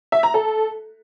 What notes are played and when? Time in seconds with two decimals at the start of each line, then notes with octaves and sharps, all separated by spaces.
0.12 E5
0.23 A#5
0.34 A4